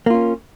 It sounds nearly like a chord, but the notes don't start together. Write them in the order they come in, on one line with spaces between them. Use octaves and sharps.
A#3 F4 C#4